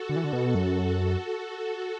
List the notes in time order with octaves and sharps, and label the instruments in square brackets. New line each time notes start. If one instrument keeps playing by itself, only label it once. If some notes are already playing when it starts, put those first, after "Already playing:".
Already playing: [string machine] F#4 A4
[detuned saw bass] D3
E3
D3
B2
[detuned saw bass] F#2 [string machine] F#4 A4